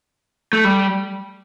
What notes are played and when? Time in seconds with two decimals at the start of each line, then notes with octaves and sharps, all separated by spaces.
0.53 A3
0.64 G3